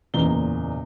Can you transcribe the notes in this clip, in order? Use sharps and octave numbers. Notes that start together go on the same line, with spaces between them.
F#1 E2 A#2 A#5 G7